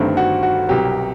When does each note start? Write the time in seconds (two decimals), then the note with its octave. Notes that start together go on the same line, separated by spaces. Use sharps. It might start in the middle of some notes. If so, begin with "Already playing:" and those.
Already playing: G1 G2 D#3 A3 C4
0.17 F#4
0.43 F#4
0.68 C2 B2 F#3 G4